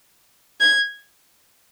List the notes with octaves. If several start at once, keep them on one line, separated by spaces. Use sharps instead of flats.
G#6